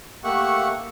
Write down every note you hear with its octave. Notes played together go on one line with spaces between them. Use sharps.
A3 A#3 G4 E5 F#5 C#6